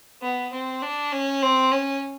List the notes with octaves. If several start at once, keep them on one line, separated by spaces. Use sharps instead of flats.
B3
C4
D4
C#4
C4
C#4